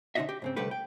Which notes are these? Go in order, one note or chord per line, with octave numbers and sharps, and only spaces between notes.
D3 C#4 D#4 F#4 D#5 E5
G4
G#2 C#3 C4
C2 D3 G3 A3 G4 B4
G5